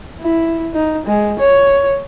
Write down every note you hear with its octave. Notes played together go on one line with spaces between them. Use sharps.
E4
D#4
G#3
C#5